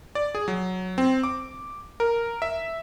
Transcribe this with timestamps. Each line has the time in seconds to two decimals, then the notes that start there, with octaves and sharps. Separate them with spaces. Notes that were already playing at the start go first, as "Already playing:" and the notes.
0.15 D5
0.35 G#4
0.48 F#3
0.98 C4
1.23 D6
2.00 A#4
2.42 E5